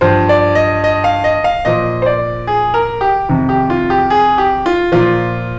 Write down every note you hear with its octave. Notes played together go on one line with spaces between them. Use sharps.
G2 F3 C5
D5
D#5
D#5
F5
D#5
F5
A#2 F3 D#5
C5
D5
G#4
A#4
G4
F2 C3 D#3
G4
F4
G4
G#4
G4
F4
A#2 F3 F4